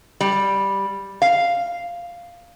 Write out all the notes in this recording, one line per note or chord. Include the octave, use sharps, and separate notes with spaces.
G3
F5